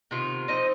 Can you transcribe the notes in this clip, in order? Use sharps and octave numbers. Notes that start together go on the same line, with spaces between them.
C3 D#3 B3 F4
F3 C4 D#4 D#5